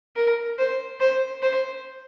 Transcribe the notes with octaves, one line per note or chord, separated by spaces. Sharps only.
A#4
C5
C5
C5